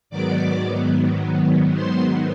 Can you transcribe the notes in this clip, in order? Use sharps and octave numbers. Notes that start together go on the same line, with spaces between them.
G#2 D#3 F#3 B3 D5 D6
C5 C6